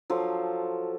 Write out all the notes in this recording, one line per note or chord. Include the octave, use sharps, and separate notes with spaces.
F3 F#3 A4 C6